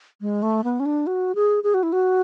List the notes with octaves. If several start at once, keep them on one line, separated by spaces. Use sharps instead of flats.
G#3
A3
B3
C#4
D4
F#4
G#4
G#4
F#4
E4
F#4